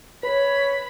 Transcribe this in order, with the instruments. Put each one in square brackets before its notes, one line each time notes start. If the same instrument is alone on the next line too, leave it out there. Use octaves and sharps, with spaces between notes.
[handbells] B4 [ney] C#5 [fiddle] B5